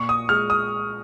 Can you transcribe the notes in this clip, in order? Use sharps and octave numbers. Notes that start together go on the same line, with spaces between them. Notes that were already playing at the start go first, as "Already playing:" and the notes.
Already playing: A#2 C#6
D#6
G#3 F6
D#6